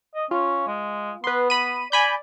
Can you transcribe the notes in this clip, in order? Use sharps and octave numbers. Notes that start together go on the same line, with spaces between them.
D#5
C#4 F4
G#3
B3 B4 C6
B5 D#7
D5 G#5 B5 G6